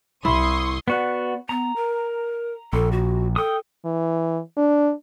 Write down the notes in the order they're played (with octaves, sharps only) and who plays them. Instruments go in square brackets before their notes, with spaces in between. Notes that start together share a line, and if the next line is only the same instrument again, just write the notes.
[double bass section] C2 [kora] E4 [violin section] C6 C#6 D#6
[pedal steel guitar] B3 F#4 [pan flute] D5
[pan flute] B3 [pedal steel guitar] A#5
[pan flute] A#4
[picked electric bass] A#1 [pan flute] A4
[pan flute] F#4
[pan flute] A4 [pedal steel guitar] G5 D#6
[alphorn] E3
D4